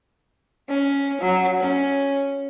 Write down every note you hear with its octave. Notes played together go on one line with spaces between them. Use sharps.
C#4
F#3
C#4